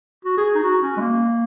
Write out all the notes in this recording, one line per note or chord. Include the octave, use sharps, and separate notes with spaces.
F#4
G#4
D#4
F#4
C#4
G#3
A#3